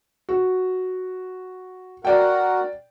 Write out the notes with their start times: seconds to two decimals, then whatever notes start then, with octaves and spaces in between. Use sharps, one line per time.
0.29 F#4
2.05 F#4 A#4 D5 F#5 G5